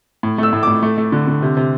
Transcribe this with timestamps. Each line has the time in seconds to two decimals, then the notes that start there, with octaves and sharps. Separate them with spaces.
0.23 A2
0.38 A3 E6
0.53 A2
0.63 A2 D6
0.82 A3
0.98 A3
1.12 D3
1.27 D3
1.42 C3
1.57 C3